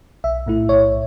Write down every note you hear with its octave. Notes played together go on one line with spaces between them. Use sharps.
B1 E5
A2 A3 E4
B1 C#5